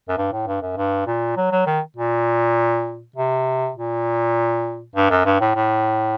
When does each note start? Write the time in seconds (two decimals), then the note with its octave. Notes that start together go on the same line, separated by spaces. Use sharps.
0.09 F#2
0.18 G2
0.33 A2
0.47 G2
0.62 F#2
0.77 G2
1.07 A#2
1.37 F#3
1.52 F#3
1.67 D#3
1.97 A#2
3.16 C3
3.76 A#2
4.96 G2
5.10 F#2
5.25 G2
5.41 A2
5.55 A2